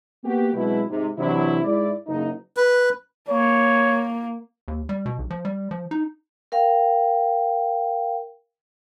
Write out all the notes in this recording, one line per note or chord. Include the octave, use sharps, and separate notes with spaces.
A#3 B3 F#4 G4
B2 F#3 G#3 C4 E4
G#2 C3
C3 E3 F#3 D4 E4
G#2 E4 D5
F#1 D#4
B4
A#3 C#5
D#2
G3
B2
B1
F3
G3
F3
D#4
A#4 F5 G5